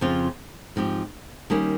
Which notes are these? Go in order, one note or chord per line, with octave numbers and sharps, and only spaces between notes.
F2 C#3 F3 C4 F4
G#2 F3 C4 G4
D#3 G3 A#3 C#4